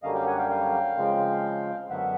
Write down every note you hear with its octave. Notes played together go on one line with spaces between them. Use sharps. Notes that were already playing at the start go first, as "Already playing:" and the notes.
F#2 D3 G3 A#3 C#4 D#5 F5
F5 G5
F#5 G#5
F5 G5
F5 G5
C#3 F3 G#3 C4
F#2 D3 F#3 B3 E5 F#5